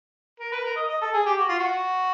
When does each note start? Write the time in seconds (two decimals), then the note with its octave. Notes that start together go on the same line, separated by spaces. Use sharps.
0.40 A#4
0.52 B4
0.64 A#4
0.76 D#5
0.89 D#5
1.01 A4
1.13 G#4
1.26 G4
1.38 F#4
1.49 F4
1.59 F#4